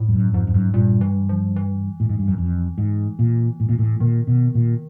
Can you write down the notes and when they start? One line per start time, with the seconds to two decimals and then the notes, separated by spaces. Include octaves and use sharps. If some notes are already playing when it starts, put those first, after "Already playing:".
Already playing: A2
0.09 G2
0.13 F#2
0.33 F2 G#2
0.47 F2
0.54 F#2
0.74 G2 A#2
1.01 E3
1.29 F3
1.56 E3
2.00 A2
2.09 G#2
2.19 G2
2.28 F#2
2.38 F2
2.78 G#2
3.19 A#2
3.60 A2
3.69 A#2
3.78 A2
4.00 A#2 D#3
4.27 B2
4.55 A#2